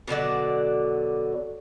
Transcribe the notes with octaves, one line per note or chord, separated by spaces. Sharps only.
B2 D3 F#3 D5